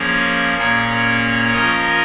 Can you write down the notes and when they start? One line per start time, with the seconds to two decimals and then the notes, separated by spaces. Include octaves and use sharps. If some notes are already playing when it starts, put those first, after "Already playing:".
Already playing: F3 A#3 C#4 G#4
0.57 A#2 A#3 C#4 G#4 C#5
1.53 F3 C#4 A#4 D#5